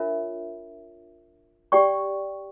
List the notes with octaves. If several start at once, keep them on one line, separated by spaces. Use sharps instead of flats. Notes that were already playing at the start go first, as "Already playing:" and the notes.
Already playing: D4 F4 A#4 C#5 E5
G4 D5 G5 C#6